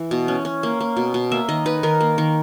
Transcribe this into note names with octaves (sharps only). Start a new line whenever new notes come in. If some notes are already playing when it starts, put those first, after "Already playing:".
Already playing: E3
B2
C#4
C#4
A#3
A#3
B2
B2
A#3 E5
D#3 D#5
D#4 B4
D#3 A#4
A#3
D#3